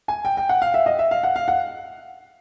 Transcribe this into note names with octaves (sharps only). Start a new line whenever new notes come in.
G#5
G5
G5
F#5
F5
E5
D#5
E5
F5
F#5
F5
F#5